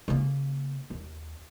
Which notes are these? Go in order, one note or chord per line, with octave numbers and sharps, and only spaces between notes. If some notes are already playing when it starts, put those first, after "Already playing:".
C#3 A#3
D#2